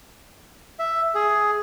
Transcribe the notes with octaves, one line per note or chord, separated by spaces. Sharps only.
E5
G#4